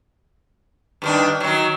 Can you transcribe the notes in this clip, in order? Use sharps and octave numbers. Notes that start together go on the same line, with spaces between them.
G2 D#3 D4
D#3 F#3